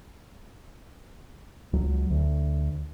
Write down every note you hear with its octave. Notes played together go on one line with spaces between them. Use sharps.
C#2 F#3
D2